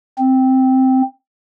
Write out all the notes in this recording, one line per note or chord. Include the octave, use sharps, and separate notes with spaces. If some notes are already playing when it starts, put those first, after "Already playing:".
C4